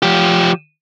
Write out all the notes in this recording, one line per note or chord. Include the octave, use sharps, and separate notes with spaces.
F3 G4